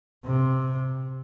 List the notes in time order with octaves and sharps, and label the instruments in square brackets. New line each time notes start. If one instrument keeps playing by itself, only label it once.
[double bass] C3